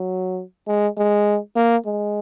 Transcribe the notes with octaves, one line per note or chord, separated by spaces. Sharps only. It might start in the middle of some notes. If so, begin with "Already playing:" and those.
Already playing: F#3
G#3
G#3
A#3
G#3